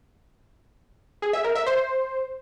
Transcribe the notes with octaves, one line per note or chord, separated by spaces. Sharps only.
G#4
E5
A#4
E5
C5